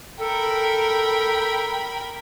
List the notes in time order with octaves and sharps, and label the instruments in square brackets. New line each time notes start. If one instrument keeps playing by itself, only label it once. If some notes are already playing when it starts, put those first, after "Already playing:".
[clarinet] A4 [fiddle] A#4 B5 [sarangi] G5